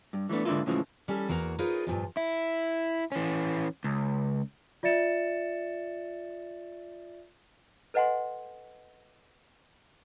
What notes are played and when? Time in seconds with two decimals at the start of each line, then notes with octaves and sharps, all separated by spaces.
0.13 G2
0.29 E3 G3 A3 B3 D4
0.45 G#2 D3 E3 A#3 E4 F4
0.66 A2 C#3 E3 F3 G#3
1.08 G3 C#4 A4
1.28 E2 A#3 F#4 A#4 A#5
1.59 D#4 F4 G#4 A#4 B4 C#5
1.87 G2 A#2 F3
2.17 E4
3.12 E3 C#4
3.84 C#2
4.83 F4 D5 E5 A6 C#7 E7
7.94 A4 B4 D#5 F#5 G#5 C6